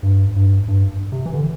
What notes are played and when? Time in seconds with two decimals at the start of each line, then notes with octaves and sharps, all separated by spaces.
0.03 G2
0.36 G2
0.68 G2
1.12 C3
1.26 E3
1.34 D3